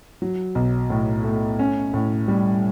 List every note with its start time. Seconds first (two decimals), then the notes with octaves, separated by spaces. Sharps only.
0.22 F#3
0.55 B1
0.90 A2
1.24 A3
1.59 C#4
1.94 A2
2.28 G3